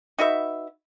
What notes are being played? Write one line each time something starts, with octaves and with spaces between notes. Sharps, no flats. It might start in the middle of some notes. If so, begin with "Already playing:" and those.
D#4 F#4 B4 E5